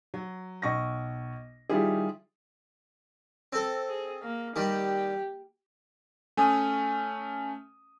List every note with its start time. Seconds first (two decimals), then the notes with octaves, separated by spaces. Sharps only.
0.14 F#3
0.62 B1 C#6 A#6
1.70 D#3 G3 E4 F4 G4 G#4
3.53 C4 A4
3.89 G#4
4.23 A#3
4.56 D#3 G3 G4
6.37 A3 C#4 G#5 D#6